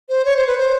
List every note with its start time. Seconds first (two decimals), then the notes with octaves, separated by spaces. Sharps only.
0.09 C5
0.25 C#5
0.37 C5
0.47 B4
0.58 C5